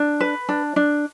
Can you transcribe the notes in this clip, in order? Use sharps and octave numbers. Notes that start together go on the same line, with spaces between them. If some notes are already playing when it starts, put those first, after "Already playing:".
Already playing: D4
B4
D4
D4